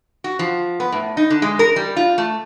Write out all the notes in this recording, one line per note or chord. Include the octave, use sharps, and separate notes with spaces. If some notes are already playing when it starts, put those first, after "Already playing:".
F#4
F3
B3
A2
D#4
D3
G#3
A#4
G3
F4
A3